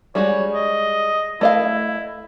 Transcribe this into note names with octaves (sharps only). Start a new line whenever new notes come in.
G3 G#3 F#4 C#5
D#5
A3 E4 D#5 F5